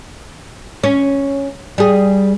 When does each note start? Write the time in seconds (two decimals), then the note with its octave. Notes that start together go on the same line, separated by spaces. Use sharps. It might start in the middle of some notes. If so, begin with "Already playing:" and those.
0.84 C#4
1.78 G3 G#4